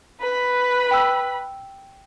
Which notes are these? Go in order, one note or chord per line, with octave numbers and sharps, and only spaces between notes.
B4 B5
G5 E6